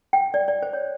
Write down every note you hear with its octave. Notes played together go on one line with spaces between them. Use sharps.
G5
D5
D5
C5
C#5